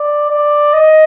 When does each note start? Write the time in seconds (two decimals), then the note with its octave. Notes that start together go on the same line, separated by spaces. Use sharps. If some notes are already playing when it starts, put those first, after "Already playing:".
Already playing: D5
0.30 D5
0.73 D#5